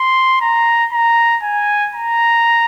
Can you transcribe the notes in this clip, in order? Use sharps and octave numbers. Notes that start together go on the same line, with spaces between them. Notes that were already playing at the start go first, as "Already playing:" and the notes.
Already playing: C6
A#5
A#5
G#5
A#5